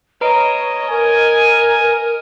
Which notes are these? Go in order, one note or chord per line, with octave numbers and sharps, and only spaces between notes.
B4 C#5 D#5 A#5 D7
A#4 G#5